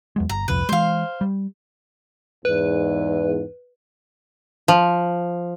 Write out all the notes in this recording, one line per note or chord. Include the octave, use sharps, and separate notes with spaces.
E2 F#3 G#3
G1 A#5
D#1 C2 F2 B4
E3 G#3 C5 F5
G3
E2 G#2 B4
F3